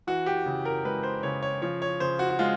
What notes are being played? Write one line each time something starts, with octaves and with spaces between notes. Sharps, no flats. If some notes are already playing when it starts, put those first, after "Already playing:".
E3 F#4
G4
C#3
A#4
G#3 B4
C5
C#3 C#5
C#5
F3 C#5
C#5
C#3 C5
F#4
F#4
G#3 F4